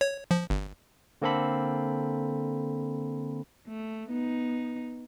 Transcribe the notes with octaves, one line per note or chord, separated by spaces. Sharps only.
C#5
F3
G1
D3 A#3 C4 A4 B5
A3
B3 D#4